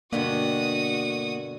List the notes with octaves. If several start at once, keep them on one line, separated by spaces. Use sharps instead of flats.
G2 B2 D3 A#3 F#4 D#6